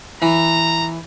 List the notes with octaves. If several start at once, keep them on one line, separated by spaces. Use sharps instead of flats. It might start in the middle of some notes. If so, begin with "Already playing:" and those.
E3 A#5